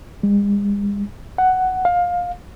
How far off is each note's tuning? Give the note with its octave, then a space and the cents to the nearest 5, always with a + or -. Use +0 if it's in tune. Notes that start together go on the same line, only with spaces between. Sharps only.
G#3 -45
F#5 +10
F5 +20